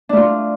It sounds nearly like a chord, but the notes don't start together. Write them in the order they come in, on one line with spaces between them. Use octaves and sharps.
D4 A3 F4